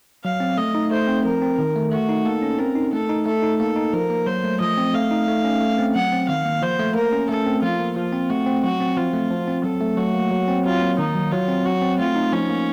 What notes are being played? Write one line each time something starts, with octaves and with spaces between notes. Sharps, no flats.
F#3 F5
C4
A3 D#5
D#4
A3 C5
C4
F3 A#4
C4
D#3
A3
A3 F#4
D#4
A#3 A4
C#4
C4 A#4
D#4
A3 A4
D#4
A3 A4
D#4
A#3 A4
D#4
F3 A#4
A#3
F#3 C5
A3
F3 D#5
C4
A3 F5
D#4
A3
C#4
A3
C4
F#3 F#5
C4
D#3 F5
A#3
F3 C5
A3
A#3 A#4
C#4
A3 A4
C4
F3 F4
A#3
F3 F4
C4
A3 F#4
C4
F#3 F#4
C4
F3 F4
A3
F3
C4
F#3 A4
A3
F#3 F#4
A#3
F#3
C4
F#3 F4
A#3
D#3 D#4
F#3
F#3 F4
C4
F#3 F#4
C4
A3 F4
D#4
F3 C#4
A#3